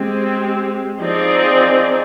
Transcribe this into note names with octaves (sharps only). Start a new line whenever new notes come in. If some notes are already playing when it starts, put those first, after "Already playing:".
Already playing: G#3 C4 G4
F3 C4 D#4 G#4 D5